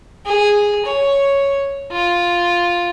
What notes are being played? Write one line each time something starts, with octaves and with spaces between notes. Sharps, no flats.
G#4
C#5
F4